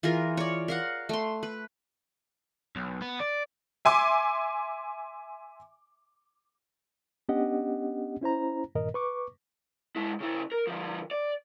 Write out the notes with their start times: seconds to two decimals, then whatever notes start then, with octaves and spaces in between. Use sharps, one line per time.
0.03 E3 F4 G#4 A#4
0.37 C#5 D5
0.68 A#4 F5 F#5
1.09 A3 C6
1.43 B4
2.76 B1
3.02 B3
3.20 D5
3.85 E5 G#5 C6 D6
7.29 B3 C#4 D4 G4 D#5 F#5
8.21 C#4 E4 C5 A#5
8.75 G2 A#2 D#3 A#4 D#5
8.94 B4 C#6 D6
9.96 G#3 E4
10.20 C#3 E4
10.52 A#4
10.67 D3 F3
11.11 D5